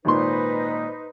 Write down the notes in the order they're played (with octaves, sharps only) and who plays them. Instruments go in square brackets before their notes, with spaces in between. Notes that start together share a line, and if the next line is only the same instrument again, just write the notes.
[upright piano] G#1 A#2 C6 [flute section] D#4 B4 C5